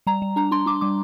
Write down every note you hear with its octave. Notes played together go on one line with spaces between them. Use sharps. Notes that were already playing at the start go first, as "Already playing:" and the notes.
G3 A#5
G3
D4 A#5
D4 C6
D4 D6
G3 D6